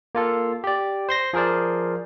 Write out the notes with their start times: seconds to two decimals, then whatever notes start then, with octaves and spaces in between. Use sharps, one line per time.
0.15 A#3 F4 A4
0.64 G4 D5
1.09 C5 C6 A#6
1.33 F3 G#4 A#4 C5 D5